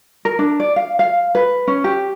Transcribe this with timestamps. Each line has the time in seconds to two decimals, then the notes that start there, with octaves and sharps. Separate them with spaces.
0.25 A#4
0.39 D4
0.60 D5
0.76 F5
0.99 F5
1.35 B4
1.67 C#4
1.84 G4